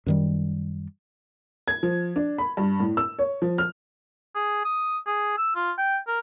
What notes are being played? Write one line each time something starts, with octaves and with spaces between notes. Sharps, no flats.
F#2 D#3 G3
G#6
F3
D4
B5
G2
A2
E6
C#5
F3
F6
G#4
D#6
G#4
E6
F4
G5
A#4